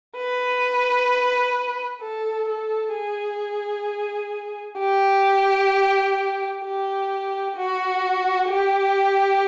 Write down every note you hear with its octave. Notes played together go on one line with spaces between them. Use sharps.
B4
A4
A4
G#4
G4
G4
F#4
G4